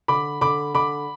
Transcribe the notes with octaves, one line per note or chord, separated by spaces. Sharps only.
D3 B5 D6
D3 B5 D6
D3 B5 D6